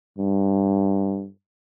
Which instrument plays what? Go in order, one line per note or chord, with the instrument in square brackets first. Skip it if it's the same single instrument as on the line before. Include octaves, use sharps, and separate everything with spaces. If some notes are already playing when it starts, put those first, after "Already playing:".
[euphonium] G2